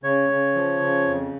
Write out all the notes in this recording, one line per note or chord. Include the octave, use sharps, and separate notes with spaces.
C#3 C#5
C#3
F3
C#3
F2